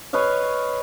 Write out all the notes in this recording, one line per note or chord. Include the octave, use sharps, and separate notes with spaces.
B4 C#5 D#5 F5